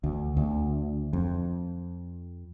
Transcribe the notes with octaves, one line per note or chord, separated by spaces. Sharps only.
D2
D2
F2